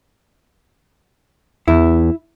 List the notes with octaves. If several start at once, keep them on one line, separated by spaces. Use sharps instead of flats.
E2 E4